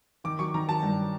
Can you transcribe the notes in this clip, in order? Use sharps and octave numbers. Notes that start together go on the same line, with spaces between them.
D#3 D6
F#3 C#6
D#3 A#5
F#3 A5
G2